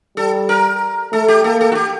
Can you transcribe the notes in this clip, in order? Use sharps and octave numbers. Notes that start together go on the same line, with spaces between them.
G3 A4
A#4
A3 A4
G4
A#3 A4
A4
F#4
G4